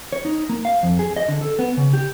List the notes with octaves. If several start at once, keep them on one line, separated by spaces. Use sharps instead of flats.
C#5
D#4
A#3
F5
F2
G#4
D#5
D3
A4
B3
C#3
G4